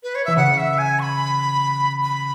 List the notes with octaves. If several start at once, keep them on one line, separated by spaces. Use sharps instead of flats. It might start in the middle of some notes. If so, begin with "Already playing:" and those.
B4
C#5
E3 E5
C#3 F#5
E5
G#5
C#6
B5
B5